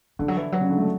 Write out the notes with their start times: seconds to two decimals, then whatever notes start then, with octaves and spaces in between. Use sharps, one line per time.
0.19 D3 E3
0.28 F#3
0.36 E3
0.52 F#3
0.61 C#3
0.69 D3
0.77 A3